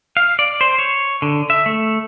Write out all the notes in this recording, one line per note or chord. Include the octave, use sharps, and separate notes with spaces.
F5
D5
C5
C#5
D3
E5
A3